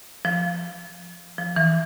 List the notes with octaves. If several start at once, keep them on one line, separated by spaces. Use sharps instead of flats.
F3
F3
E3